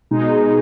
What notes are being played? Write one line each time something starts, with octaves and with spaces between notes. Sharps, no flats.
B2 G#3 D#4